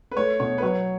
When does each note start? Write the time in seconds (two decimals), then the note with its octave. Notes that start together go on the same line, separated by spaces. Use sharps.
0.12 B4
0.17 A3 C#5
0.40 B2 C#5
0.58 B4
0.62 F#3 C#5